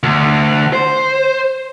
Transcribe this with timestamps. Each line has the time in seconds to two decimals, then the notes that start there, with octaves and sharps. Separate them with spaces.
0.03 D2
0.73 C5